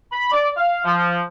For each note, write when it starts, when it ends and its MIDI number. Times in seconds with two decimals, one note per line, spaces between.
0.12 0.31 83
0.32 0.49 74
0.57 0.82 77
0.84 1.22 53